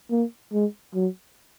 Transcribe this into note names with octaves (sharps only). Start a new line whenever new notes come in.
A#3
G#3
F#3